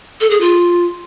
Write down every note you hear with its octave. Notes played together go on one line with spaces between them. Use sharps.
A4
G#4
F4